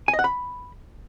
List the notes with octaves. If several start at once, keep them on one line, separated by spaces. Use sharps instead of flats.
G#5
D#5
F#5
B5